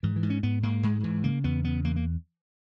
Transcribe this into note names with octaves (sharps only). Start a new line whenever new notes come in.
G#2 E3
E3
G#2
C#4
G#2 B3
G#2 A#3
G#2 G#3
G#2 E3
C#3 A#3
E2 B3
C#3 B3
E2 A#3
A#3